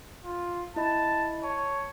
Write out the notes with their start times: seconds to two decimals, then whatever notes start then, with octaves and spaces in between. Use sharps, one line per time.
0.25 F4
0.76 E4 D#5 A5 B5
1.44 C#5 A5